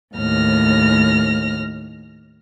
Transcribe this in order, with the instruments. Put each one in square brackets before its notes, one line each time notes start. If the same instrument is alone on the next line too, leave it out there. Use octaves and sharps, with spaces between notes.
[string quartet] D#2 A2 F6 A#6